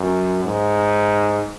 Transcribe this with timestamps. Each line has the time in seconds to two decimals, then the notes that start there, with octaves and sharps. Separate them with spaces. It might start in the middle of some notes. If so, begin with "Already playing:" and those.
Already playing: F#2
0.45 G#2